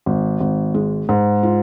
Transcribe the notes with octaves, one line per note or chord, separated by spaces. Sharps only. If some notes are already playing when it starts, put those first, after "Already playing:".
G#1
G#1
G#3
G#2
F4